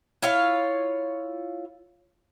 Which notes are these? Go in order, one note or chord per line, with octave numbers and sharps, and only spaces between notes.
E4 F4 C#5 F5